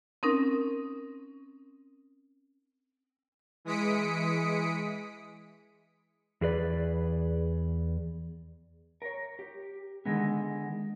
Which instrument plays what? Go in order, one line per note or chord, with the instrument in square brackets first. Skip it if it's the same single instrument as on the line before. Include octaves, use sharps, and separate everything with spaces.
[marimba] C4 C#4 D#4 A#4
[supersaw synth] E3 G#3 D#6 B6 C#7 D7
[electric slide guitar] E2 G#4 B4 D5
A#4 C#5
G4
D3 D#3 G#3 B3